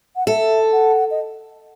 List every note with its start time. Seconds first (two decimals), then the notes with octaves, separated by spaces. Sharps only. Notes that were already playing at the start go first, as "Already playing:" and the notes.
0.16 F#5
0.27 A4 E5
0.73 F#5
1.11 D#5